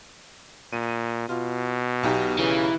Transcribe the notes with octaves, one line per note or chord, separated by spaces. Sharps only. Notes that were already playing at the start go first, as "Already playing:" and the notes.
A#2 D#7
B2 F4
B1 D#4 G4
C#3 E3